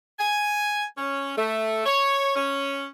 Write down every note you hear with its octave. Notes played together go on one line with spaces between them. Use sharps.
G#5
C#4
A3
C#5
C#4